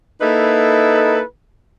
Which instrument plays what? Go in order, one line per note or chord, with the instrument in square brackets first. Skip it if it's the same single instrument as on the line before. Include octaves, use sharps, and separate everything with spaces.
[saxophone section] A#3 D#4 E4 A4 B4